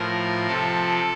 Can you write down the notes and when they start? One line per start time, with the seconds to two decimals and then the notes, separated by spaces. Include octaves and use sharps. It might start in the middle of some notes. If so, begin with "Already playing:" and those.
Already playing: A2 F3 A#4
0.47 C3 F3 A4